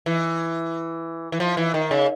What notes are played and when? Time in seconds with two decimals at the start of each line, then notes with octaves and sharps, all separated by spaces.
0.06 E3
1.32 E3
1.40 F3
1.57 E3
1.74 D#3
1.91 C#3